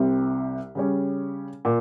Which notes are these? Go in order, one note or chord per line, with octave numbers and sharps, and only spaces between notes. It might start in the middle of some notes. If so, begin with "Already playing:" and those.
Already playing: C2 C3 G3 C4
C#3 G3 C#4
A#2